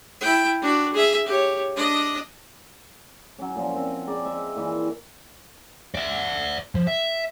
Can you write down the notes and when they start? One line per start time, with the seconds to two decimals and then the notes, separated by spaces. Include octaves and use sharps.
0.21 E4 G5
0.62 D4 F#4
0.94 G#4 E5
1.27 G4 C#5
1.75 D4 D#5
3.39 F#3 C#4
3.56 A#2 F3
3.76 C4
4.07 G#4 D5 A#5
4.25 D#5 E5
4.56 A#2 E3
5.95 D5 E5
6.75 F3
6.87 E5